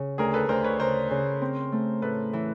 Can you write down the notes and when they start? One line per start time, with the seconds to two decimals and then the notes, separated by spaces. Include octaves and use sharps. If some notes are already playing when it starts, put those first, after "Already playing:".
Already playing: C#3
0.18 D2 G#4 A#4
0.34 A4 B4
0.49 D2 A#4 C5
0.64 B4 C#5
0.79 C#3 A#4 C5
1.11 C#3
1.41 C4
1.72 A3
2.02 A2 A4 B4
2.33 E3